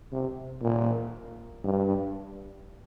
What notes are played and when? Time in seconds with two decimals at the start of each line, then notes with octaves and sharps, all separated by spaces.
0.12 C3
0.62 A#2
1.64 G2